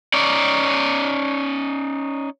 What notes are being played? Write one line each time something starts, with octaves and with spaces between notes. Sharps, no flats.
C#4 D#4 D5